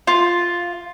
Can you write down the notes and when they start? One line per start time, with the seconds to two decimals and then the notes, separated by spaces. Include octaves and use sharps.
0.07 F4